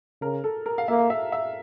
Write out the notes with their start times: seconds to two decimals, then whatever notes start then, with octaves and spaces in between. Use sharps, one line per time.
0.21 C#3 A#4
0.44 A4
0.66 A#4
0.78 F5
0.88 A#3 E5
1.10 E5
1.32 E5